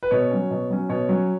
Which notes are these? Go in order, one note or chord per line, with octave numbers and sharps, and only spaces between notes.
B4
B2 C#5
F#3 C#4
B2
F#3 C#4
B2 C#5
F#3 C#4